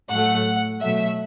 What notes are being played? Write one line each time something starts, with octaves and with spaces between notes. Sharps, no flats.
A2 F#3 A3 F#5
B2 F#3 A3 E5